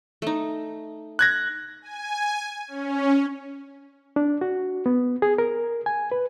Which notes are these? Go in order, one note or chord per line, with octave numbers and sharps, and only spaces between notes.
A3 D#4
F#6 G#6 A#6
G#5
C#4
D4
F#4
B3
G#4
A#4
G#5
B4